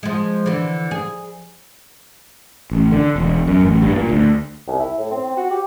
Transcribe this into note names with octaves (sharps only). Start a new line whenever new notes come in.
F3 G#3
D3 E3
G#4
A1
D3
E1
F#2
A1
G2
A#2
D2
C2
E4
A2
C4
C4
F#4
G4